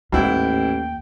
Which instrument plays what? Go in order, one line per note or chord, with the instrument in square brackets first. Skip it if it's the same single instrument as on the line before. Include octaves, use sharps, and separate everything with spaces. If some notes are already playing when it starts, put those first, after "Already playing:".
[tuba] A1 [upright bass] D#2 [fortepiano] G#2 B3 E4 [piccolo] G5